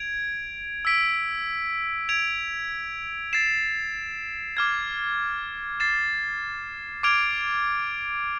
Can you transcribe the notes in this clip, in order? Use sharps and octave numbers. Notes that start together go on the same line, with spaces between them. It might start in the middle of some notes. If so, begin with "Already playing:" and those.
Already playing: G#6 D7 F7
E6 B6 D7
G#6 D7 F7
A6 C7 E7
D6 F6 G#6
A6 C7 E7
D6 F6 G#6 D7 F7